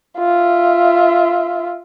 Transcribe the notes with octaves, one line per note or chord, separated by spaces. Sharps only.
F4 E5